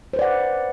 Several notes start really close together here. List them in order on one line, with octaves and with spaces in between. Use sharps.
C5 B4 D5 F#5